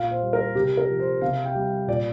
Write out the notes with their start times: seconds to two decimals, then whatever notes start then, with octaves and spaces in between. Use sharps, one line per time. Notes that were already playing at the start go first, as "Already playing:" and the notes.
Already playing: A#2 F5
0.11 C5
0.22 G3
0.33 A#4
0.55 C3 G4
0.77 A#4
0.88 F3
0.99 C5
1.21 C3 F5
1.44 G5
1.55 G3
1.87 A#2 D5